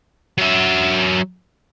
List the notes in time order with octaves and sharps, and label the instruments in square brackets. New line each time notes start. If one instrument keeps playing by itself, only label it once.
[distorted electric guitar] F#3 E5